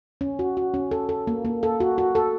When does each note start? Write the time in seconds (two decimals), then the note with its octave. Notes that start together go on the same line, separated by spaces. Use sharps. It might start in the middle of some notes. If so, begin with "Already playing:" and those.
0.21 C#4
0.39 F#4
0.57 F#4
0.74 C#4
0.91 A4
1.09 A4
1.27 A#3
1.45 A#3
1.63 A4
1.80 F#4
1.98 F#4
2.15 A4